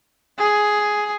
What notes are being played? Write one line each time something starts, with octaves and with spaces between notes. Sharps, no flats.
G#4